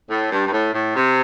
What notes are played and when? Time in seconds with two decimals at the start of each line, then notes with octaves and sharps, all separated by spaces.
0.10 A2
0.32 G2
0.47 G2
0.53 A2
0.74 A2
0.96 C3